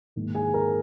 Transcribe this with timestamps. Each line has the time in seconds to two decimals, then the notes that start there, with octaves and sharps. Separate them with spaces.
0.16 G#2 D#3 A#3
0.34 G#4 G#5
0.54 A#4 A#5